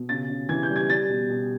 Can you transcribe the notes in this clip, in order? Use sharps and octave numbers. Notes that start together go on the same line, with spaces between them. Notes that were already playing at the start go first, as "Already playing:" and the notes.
Already playing: B2
C#3 A6
C#3
E3 G#6
G6
G3
G#6
G3 A6
B2
B2